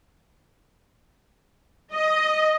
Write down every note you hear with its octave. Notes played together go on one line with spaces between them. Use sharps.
D#5